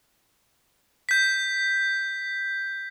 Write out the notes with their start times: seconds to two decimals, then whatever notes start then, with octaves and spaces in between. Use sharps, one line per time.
1.09 G6 B6